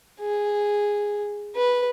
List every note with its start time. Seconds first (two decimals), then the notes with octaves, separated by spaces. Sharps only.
0.21 G#4
1.55 B4